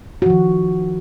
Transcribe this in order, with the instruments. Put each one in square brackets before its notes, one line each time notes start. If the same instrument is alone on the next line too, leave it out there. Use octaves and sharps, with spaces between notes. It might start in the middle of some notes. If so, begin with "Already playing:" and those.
[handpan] F#4
F3
D#3